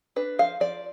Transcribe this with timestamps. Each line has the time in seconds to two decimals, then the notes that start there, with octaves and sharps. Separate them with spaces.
0.16 D4 B4
0.39 F3 F5
0.60 F3 D5